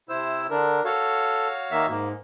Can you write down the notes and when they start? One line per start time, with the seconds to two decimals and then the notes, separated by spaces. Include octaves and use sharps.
0.09 C3 E4 C5 E6
0.50 D3 D4 A#4
0.85 F#4 A4 C#5 F5
1.71 D#3 A#3 E5
1.89 G#2 A#3